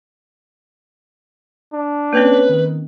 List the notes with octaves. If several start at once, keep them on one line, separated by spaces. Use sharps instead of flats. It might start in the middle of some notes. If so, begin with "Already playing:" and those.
D4
A#3 C4 C#4 B4 C#5
D#3